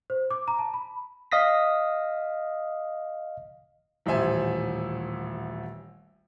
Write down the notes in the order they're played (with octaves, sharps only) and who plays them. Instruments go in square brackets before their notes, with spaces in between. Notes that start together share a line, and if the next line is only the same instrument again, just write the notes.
[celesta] C5
D6
A#5
A5
B5
[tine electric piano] D#5 F5 D#6 A#6 B6
[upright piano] D#1 A1 C5 E5 G#5